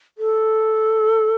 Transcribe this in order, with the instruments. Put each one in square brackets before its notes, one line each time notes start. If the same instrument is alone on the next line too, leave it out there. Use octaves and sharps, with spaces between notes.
[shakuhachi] A4